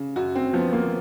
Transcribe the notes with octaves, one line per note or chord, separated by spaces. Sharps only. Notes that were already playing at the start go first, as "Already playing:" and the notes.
Already playing: C#3
F#2 F#4
C4
F3 B3
A#3